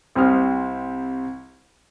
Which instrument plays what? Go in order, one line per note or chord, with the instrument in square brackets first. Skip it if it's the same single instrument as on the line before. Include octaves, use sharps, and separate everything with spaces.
[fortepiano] C2 C3 C5 D#6 F6